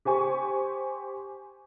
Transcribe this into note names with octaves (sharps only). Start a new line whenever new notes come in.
G4 C5 G#5 C#6